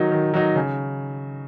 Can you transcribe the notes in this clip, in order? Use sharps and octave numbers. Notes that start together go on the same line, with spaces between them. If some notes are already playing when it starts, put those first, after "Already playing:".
Already playing: D#3 F#3 D#4
D#3
F#3 D#4
C#3